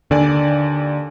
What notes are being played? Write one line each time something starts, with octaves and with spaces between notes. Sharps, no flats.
D#2 D3 D5 G#5